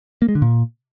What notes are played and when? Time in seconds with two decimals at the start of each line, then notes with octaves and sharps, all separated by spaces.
0.22 A#3
0.28 G#3
0.35 D3
0.42 A#2